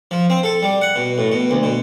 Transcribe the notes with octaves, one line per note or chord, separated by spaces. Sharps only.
F3
C4
A4
G3
F#5
B2
A2
B2
D2
B2